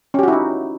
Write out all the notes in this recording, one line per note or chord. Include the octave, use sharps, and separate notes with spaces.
C#4 D#4 E4 F#4 G4